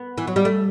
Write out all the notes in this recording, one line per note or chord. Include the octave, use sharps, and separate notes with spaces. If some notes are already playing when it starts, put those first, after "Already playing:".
Already playing: B3
E3
F#3
G3
A3